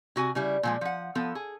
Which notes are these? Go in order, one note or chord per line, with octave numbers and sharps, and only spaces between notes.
C3 F#4 G#5
C#3 G3 E4
A#2 F3 G#3
F3 F#5
F3 B3 A4
G#4